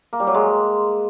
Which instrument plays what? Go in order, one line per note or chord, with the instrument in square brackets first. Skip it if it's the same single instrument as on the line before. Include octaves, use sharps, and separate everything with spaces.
[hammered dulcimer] A#3
G3
F#3
G#3